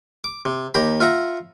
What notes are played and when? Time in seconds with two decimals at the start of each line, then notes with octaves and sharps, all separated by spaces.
0.24 D6
0.45 C3
0.74 D#2 G4 A#5 B5
1.00 F4 E5 F#5 A#5